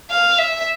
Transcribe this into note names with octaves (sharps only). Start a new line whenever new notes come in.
F5
E5